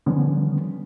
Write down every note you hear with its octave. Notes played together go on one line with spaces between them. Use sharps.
D3 D#3 F3 G3 B3 C#4